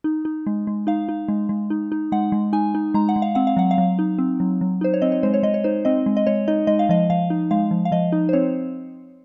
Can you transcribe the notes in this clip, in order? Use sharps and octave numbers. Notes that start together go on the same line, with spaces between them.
D#4
D#4
G#3
G#3
D#4 F5
D#4
G#3
G#3
D#4
D#4
G#3 F#5
G#3
D#4 G#5
D#4
G#3 A#5
F#5
G#3
F5
C4 F#5
F5
F#3 F#5
F5
F#3
D#4
C4
F#3
F#3
D#4 C5
C#5
C4 D#5
C#5
G#3 C5
C#5
G#3 D#5
C#5
D#4 C5
C4 D#5
G#3
D#5
G#3 C#5
D#4 D#5
G#3 D#5
F5
F3 D#5
F3 F5
D#4
G#3 F5
F3
F5
F3 D#5
D#4
C5
C4 C#5